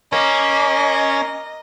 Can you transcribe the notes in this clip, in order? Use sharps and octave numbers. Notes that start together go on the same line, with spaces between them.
A#3 C#4 D#5